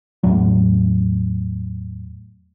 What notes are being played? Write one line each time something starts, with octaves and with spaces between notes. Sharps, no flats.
E2 A2 F#3